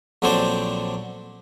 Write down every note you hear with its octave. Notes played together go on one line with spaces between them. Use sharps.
A#1 D3 F#3 C4 D4 C5